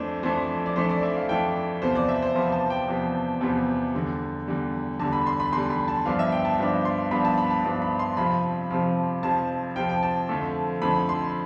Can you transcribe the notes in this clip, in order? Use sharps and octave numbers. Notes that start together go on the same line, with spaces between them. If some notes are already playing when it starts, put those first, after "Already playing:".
Already playing: F2 E3 A3 D4 C5
F2 E3 A3 D4 C5
D5
F2 E3 A3 D4 C5
D5
E5
F5
F2 E3 A3 D4 G5
E2 C3 F3 B3 C5
D5
E5
C5
E2 C3 F3 B3
A5
G5
E2 C3 F3 B3
E2 C3 F3 B3
E2 D3 G3
E2 D3 G3
E2 D3 G3 A5
B5
C6
B5
E2 D3 G3 C6
B5
A5
G2 F3 B3 D4 F5
E5
G5
A5
G2 F3 B3 D4
C6
G2 F3 B3 D4 B5
A5
B5
A5
G2 F3 B3 D4
B5
C6
F2 C3 F3 B5
F2 C3 F3
F2 C3 F3 A5
F2 C3 F3 G5
G5
A5
F2 D3 F3 A3
F2 D3 F3 A3 B5
C6